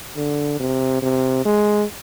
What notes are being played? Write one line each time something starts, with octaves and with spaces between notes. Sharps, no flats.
D3
C3
C3
G#3